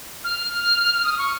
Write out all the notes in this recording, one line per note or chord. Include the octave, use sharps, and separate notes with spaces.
F6
D#6
C#6